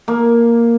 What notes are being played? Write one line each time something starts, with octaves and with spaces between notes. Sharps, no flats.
A#3